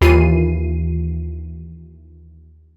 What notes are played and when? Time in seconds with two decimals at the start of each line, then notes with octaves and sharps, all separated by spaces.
0.01 D#2 E3 F4 C7 D#7